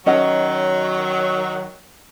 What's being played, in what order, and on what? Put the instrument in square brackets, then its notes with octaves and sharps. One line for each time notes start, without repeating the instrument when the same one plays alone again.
[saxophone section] D#3 F#3 [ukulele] C#4 D#5 F#5